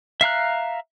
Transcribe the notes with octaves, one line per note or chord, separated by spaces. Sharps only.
E5 F5 A#5 F#6